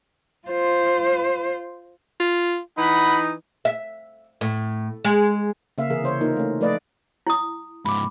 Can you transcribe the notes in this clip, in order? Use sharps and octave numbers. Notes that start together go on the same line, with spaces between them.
F4 C5
F4
E3 D#4 F#5 B5
E5
A2
G#3
C#3 A#3 E5 F5
C3 E3 G#4 A#4 F5
C#3 C5 C#5
A#3 D#4 F4 A#4
A3 C#4
F3 A3 B4 D5 D#5 F5
E4 D#6
C#2 G#2 B5 D6